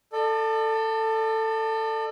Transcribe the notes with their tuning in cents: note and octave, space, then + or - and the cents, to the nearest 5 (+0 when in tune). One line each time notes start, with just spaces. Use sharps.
A4 +15 D5 +45